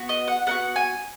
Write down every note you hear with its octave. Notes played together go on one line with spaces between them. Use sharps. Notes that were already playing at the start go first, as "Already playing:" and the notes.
Already playing: B3 F#4
D#5
F#5
B3 D#4 F#4 F#5
G#5